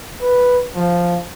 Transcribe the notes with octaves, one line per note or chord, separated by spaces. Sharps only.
B4
F3